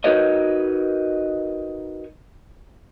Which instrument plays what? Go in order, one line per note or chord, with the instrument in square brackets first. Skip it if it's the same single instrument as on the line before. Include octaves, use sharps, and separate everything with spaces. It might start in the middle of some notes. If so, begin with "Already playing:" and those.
[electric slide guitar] D#4 F#4 A#4 B4 C#5 D#5